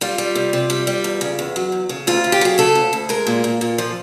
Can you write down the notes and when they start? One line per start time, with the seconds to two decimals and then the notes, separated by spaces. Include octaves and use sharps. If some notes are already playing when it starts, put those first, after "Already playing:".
0.01 G3 F4
0.18 G3
0.35 C3
0.53 C3
0.70 G3
0.87 G3
1.04 E2
1.21 C#3
1.39 E2
1.56 F#3
1.72 E2
1.89 C#3
2.07 D2 F4
2.24 C#3
2.32 G4
2.41 F#3 G#4
2.58 C#3 A4
2.75 D2
2.93 D2
3.09 G#3 A#4
3.27 A#2
3.44 A#2
3.61 A#2
3.78 F3